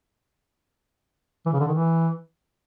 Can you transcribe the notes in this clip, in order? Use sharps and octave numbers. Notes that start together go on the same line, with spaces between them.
E3
C#3
D3
D#3
E3